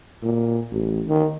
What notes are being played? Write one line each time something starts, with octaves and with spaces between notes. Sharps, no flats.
A#2
A1
D#3